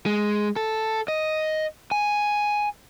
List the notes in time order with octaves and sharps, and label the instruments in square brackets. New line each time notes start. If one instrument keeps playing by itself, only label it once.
[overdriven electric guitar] G#3
A4
D#5
G#5